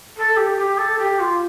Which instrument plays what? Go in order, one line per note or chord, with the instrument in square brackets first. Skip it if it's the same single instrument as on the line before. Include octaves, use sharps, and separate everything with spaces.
[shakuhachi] A4
G4
G4
A4
G4
F4